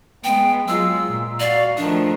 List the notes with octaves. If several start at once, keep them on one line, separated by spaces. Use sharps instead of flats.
G#3 B3 G5
F#3 G#3 F4 E6
A#2
F#4 D5 F5
D#3 F3 A3 D4